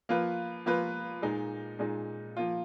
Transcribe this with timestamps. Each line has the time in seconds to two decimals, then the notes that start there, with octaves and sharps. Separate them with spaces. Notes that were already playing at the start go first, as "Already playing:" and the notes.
0.09 F3 A#3 F4 B4
0.66 F3 A#3 F4 B4
1.22 A#2 G#3 D#4
1.79 A#2 G#3 D#4
2.37 F3 A#3 F4